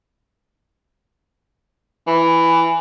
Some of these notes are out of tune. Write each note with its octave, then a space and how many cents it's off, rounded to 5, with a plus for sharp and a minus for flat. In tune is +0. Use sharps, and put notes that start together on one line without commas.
E3 +5